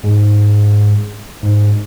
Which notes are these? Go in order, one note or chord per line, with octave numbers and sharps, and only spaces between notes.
G#2
G#2